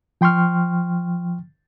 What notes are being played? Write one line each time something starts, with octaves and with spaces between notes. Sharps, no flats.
F3 G5 C6 C#6 F6